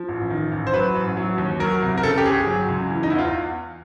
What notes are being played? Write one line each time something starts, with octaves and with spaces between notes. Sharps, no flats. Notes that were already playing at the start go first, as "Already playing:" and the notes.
Already playing: F3
A1
D#3
A1
C5
F#3 B4
A1
F#3
D#2
F#3 A#4
C2
A#4
C#3 A4
G4
G1 G#4
F#3
C#2
E3
D#4
E2 E4
F4